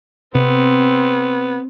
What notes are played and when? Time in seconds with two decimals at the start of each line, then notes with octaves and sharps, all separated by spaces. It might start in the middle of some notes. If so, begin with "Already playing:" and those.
0.35 C3 B3 C4